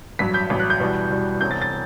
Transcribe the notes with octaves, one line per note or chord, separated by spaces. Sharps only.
A1 G2 F#3 B6
G6
A1 G2 F#3
F#6
G6
E2 B2 G3
E2 B2 G3
E1 E2 C3 G6
A6
A6